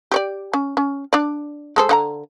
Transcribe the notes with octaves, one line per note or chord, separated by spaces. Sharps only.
G4 C#5 D5
C#4
C#4
D4 D5
G#3 A4 C5
D3 F#5 A#5